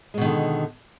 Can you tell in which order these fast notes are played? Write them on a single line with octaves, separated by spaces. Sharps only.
G#3 B2 D#3 D3